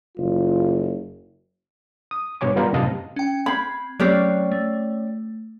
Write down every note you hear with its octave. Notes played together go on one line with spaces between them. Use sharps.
F#1 F4
D#6
G2 B2 C#5 G#5 D6
D#3 G3 B3 F4 G4 A#4
F#2 A2 C3 D#5 F5 A5
C#4 G5
C4 B5 G#6
F#3 A3 C4 C#4 G4 D5
A3